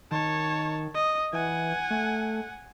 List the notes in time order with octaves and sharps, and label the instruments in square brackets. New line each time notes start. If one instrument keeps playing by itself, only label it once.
[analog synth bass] D#3 [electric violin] C#5 A5
[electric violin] D#5
[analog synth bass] E3 [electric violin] F#5 G#5
[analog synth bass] A3